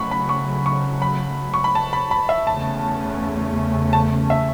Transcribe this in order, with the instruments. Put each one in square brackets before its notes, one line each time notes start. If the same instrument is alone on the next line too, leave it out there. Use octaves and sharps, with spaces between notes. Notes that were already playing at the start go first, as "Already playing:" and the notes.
Already playing: [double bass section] C#3 F#3 A3 [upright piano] B5 C#6
[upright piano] B5
C#6
C#6
B5
C#6
B5
A5
B5
B5
E5
[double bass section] E2 C#3 A3 C#4 [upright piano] A5
[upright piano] A5
E5